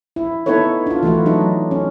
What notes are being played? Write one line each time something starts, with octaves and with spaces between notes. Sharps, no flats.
E4
B3 D#4 E4 A4 B4 C#5
D4 F4
E3 A3 E4 F#4
F#3 D4 D#4
C#4